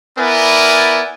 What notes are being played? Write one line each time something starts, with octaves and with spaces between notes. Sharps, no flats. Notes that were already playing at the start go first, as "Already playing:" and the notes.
B3 E4 A#4 D5 G#5